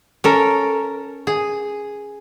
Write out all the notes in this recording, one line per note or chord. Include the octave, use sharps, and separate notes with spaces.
C#4 A4 A#4
G#4